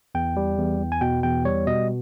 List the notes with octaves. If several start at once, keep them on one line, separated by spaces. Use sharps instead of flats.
E2 G5
G3
E2
E2
G#5
B2 G5
E2 G5
G3 C#5
B2 D#5